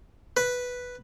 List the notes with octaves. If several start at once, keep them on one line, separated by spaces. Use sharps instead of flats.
B4